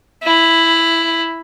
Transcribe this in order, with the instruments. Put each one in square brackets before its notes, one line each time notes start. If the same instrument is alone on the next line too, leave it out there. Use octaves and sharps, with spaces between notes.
[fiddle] E4